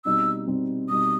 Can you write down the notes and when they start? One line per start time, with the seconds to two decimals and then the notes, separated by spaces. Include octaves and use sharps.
0.05 B2 G3 C4 D#4 E6
0.47 B2 G3 C4 D#4
0.89 B2 G3 C4 D#4 D#6